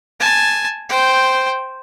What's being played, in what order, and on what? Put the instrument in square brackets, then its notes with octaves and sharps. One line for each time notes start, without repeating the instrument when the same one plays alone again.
[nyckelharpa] G#5 A5
C5 G5